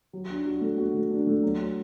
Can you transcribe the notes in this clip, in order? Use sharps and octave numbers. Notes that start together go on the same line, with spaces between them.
F#3
D4
F#4
A3
F#4
A3
D4
A3
F#3
F#3